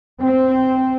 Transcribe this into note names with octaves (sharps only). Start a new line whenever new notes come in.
C4